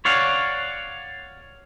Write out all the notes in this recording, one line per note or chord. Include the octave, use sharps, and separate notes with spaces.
C#5 D5 F5 F#5